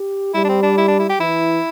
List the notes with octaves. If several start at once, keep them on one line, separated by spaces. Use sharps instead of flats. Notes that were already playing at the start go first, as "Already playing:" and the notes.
Already playing: G4
G3 E4
D4
C4
D4
E4
D4
E4
G4
E3 E4